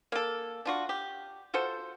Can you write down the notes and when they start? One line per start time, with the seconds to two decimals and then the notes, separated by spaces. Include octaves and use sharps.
0.12 A#3 A4
0.65 D4 F4 F#4
0.89 G4
1.54 F4 F#4 A4 C5